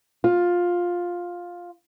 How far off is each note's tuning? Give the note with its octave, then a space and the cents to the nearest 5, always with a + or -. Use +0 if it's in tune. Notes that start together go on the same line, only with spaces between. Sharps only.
F4 +10